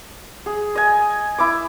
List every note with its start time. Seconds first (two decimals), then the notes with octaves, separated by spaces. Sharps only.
0.46 G#4
0.75 D#5 G#5
1.38 E4 D6